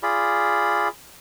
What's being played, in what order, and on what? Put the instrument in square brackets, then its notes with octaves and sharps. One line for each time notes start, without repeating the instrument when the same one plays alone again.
[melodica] F4 G#4 D5 B5